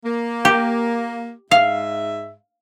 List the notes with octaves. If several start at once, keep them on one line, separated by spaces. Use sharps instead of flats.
A#3
G4
G#2 G#3 E5 F5